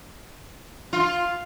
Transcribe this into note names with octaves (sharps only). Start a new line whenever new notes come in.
F4